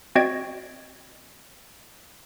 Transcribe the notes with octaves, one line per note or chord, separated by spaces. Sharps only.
C4 F#4 D5 D#5 G#6 D7